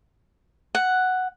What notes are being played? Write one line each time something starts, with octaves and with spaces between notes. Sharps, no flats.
F#5